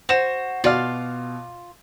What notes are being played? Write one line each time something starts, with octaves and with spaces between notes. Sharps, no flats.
F#4 C5 E7
B2 F4 F#4 D5 F5